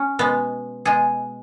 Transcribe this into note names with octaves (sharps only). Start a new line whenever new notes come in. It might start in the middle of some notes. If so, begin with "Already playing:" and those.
Already playing: C#4
B2 G#3 B3
B2 G#3 G#4